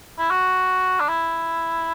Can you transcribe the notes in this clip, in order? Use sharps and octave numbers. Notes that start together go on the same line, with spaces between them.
E4
F#4
D4
E4